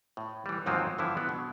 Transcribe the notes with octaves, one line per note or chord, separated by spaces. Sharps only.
A2
E3 G3
D#2 G#2 F3 F#3 A#3 C4
G2 D3 E3 F3 E4
F#3 B3 D4
B2